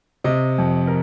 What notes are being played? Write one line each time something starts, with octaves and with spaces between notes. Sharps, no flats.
C3 D#5
F2
A#4